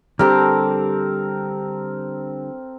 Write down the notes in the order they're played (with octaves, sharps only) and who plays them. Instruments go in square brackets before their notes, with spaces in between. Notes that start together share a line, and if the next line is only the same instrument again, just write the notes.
[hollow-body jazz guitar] D3 G3 G4 [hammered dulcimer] C4 A4 A#4